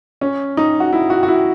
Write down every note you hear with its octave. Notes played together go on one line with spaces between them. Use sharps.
C#4
D#4
F#4
E4
F#4
F#4
E4